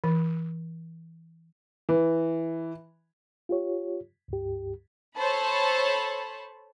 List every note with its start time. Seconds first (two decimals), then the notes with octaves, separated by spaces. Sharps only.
0.04 E3
1.89 E3
3.49 F4 G4 C#5
4.28 C#2 G2 G4
5.16 A4 C5 C#5 A5 B5